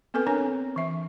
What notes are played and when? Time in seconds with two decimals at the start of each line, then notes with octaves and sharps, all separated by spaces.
0.14 B3 C4 A4 B4 G#5
0.27 C4 D4 A#4 C#5 G#5
0.76 E3 E5